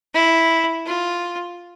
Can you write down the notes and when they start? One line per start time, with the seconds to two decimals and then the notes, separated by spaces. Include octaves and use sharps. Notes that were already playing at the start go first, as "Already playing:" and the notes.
0.14 E4
0.86 F4